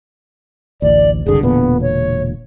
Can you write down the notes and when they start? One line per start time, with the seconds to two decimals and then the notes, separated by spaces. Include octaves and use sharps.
0.82 A1 D2 D5
1.26 F#1 C2 D3 G#4
1.43 E1 A#2 D3 B3
1.82 C#5